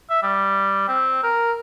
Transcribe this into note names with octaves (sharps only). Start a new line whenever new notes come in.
E5
G3
C4
A#4